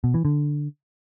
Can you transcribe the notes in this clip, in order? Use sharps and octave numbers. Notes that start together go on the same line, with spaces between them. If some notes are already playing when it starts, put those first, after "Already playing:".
B2
E3
D3